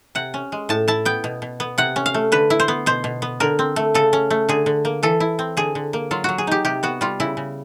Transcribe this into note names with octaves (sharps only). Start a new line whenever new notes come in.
C3 F#5
C#4
G#3
A2 A5
E4 A5
B3 G5
B2
B2
B3
C3 F#5
C#4
F5
A3
D3 B4
E4
C5
B3
B2 C5
B2
B3
D3 A#4
C4
A3
C#3 A4
C#4
A3
D3 G#4
D3
A#3
E3 A4
E4
C4
D3 G#4
D3
A#3
F#3 F4
F#3 F#4
G#4
D#4 G4
C3 G4
B3 F#4
G3 F4
C#3 E4
C#3